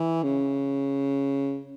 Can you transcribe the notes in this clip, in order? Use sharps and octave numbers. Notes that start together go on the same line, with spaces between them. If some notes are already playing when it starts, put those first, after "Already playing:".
Already playing: E3
C#3